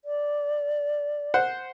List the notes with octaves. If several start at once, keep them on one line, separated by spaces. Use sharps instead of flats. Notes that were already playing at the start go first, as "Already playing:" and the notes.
D5
C5 F#5